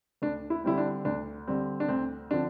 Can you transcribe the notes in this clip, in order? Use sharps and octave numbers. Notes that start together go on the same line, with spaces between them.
D2 D4
E4
D3 G3 C4 E4
D4
D2 D4
D3 G3 C4
D4
D2 C4
D3 F3 C4 D4